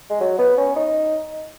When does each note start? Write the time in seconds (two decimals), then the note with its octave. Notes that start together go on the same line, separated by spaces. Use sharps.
0.10 G#3
0.20 F#3
0.39 B3
0.58 C#4
0.76 D#4